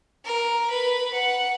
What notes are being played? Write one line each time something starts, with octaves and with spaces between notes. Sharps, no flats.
A#4
B4
F#5